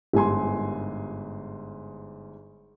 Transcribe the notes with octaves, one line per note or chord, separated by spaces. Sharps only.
G1 G#2 G#5 C6